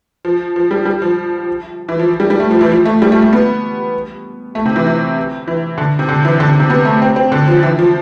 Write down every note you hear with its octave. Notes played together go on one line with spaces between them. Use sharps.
F3
F3
G3
G3
F3
E3
F3
G3
G3
A3
F3
E3
F3
A3
G3
A3
A3
B3
A3
C3
E3
E3
E3
D3
C3
D3
E3
D3
C3
C3
B3
A3
C4
C4
D3
F3
E3
F3